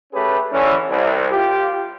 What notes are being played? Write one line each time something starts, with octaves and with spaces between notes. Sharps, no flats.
A3 C#4 G4 G#4 B4
D3 E3 C#4
C2
F4 G4